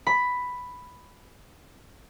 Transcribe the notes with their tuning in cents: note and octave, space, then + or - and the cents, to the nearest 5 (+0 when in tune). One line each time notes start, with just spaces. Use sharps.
B5 +5